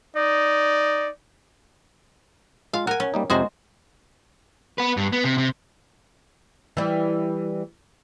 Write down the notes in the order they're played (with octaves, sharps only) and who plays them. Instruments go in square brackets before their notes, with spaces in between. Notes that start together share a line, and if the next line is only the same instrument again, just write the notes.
[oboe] D#4 [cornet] D5
[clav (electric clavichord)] G#3 F4 [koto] F5
[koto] A#4 G#5 [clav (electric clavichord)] F#5
[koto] C#4
[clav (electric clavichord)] G3 A#3 D#4
[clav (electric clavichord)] F2 C3 A#5 [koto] G#3 F#4 C5
[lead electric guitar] B3 B4
G2
B3
C3
C3
[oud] E3 G3